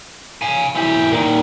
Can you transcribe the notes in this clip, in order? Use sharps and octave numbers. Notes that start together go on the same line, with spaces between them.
F5 G#5
E3 G4
A#2 D#3